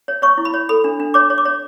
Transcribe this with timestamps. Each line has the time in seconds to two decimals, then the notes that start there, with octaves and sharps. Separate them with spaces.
0.08 C#5
0.22 C#5 C#6
0.38 E4
0.45 B5
0.54 C#5
0.69 A4 B5
0.84 D4
1.00 D4
1.14 C#5 D6
1.30 C#5
1.38 D6
1.45 C#5